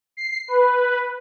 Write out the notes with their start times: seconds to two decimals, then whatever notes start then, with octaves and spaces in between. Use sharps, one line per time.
0.17 C7
0.48 B4